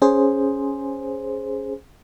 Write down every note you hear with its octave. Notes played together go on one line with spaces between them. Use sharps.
C#4 G#4 C5